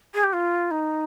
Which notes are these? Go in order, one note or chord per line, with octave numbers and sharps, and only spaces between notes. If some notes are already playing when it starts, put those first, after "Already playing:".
G#4
G4
F4
D#4